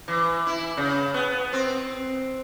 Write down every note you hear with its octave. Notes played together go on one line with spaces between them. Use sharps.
E3
E4
C#3
B3
C4